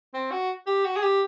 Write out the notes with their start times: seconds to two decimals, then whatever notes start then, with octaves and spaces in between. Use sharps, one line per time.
0.14 C4
0.31 F#4
0.67 G4
0.85 F#4
0.96 G#4
1.02 G4